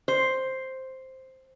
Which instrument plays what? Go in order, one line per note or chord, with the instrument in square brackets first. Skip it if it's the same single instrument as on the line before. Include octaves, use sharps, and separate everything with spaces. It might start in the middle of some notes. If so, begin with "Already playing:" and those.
[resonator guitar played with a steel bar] C5